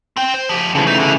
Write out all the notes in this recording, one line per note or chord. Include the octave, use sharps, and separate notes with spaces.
C4 G5
C5
F3 G4
C#3 E3 F3 A3
D#4
D3